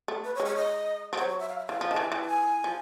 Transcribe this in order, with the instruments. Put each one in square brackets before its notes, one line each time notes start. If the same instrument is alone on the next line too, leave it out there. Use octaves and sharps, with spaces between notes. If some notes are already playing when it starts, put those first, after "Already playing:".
[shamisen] A3
[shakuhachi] B4
C#5
[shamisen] G#3
[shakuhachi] C#5
D#5
[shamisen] F3
[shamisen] F#3 [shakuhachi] C5
[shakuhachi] C#5
E5
F5
E5
[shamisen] E3 [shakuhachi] F5
[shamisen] F3
[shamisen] D#3 [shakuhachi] A5
[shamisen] E3 [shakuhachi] G#5
[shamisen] E3 [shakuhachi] G5
[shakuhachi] A5
G#5
[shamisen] F3